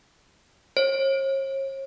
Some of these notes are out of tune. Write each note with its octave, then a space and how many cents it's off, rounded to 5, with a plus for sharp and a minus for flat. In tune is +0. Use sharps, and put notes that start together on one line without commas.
C#5 -40